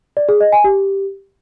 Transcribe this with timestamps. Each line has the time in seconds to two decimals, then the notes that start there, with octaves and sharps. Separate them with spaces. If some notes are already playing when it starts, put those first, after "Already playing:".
0.17 D5
0.29 G#4
0.41 D#5
0.52 G#5
0.64 G4